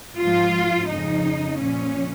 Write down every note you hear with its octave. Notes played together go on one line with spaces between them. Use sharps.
G#2 F3 F4
F2 C#3 F3 D#4
A#2 F3 C#4